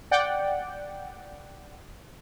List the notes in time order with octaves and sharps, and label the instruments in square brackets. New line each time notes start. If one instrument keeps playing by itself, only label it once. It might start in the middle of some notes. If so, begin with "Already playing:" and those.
[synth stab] D5 F#5 G5